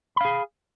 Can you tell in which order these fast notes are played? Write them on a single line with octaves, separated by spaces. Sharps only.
B5 F5 G#4